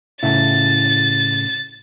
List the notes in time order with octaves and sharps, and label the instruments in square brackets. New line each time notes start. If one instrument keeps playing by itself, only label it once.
[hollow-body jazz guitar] A2 C#3 E4 [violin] A6